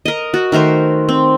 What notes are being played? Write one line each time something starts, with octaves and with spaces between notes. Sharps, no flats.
A#4 D#5
F#4
D#3 A3 A#4 C5
C4